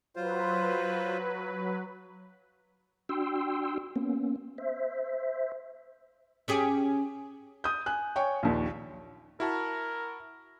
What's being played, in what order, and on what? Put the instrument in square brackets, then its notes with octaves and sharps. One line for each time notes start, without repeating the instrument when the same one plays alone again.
[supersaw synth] F#3 B4 [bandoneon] F4 C5
[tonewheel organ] D4 F#4 G5 C6 E6
A#3 B3 C#4
C5 E5
[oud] C#4 G4 G#4
[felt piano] D#6 G6
G#5 F#6
C#5 G5 G#5 C#6
A#1 D#2
[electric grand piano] E4 F#4 A5 [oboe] A#4